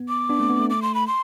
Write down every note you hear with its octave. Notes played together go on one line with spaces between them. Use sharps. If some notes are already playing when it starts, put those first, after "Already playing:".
Already playing: B3
D6
B3 D4
A3 C4
B3
A3
D6
C6
B5
C6